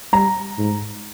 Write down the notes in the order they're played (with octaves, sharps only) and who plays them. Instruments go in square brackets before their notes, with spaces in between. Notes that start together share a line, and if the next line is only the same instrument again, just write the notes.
[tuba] G3 [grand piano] A#5
[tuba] G#2